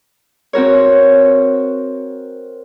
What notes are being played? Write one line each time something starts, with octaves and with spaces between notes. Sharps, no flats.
C4 F#4 A#4 C#5